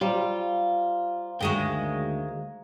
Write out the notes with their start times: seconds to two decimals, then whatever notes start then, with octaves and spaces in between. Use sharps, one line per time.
0.01 G3 F4 C5 F5 A#5
1.41 D2 D#3 G#3 F#4 G5